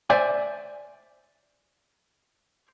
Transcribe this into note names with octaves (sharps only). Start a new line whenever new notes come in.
C5 D5 E5 G#5